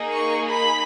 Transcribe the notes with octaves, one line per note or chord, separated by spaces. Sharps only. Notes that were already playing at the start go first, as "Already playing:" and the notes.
Already playing: A#3 D#4 G#4
C#6
B5